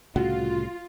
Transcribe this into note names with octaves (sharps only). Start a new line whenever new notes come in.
C2 A2 C#3 F4 F#4